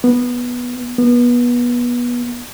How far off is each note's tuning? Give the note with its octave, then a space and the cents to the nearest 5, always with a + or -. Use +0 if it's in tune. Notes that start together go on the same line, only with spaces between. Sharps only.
B3 -10
B3 -25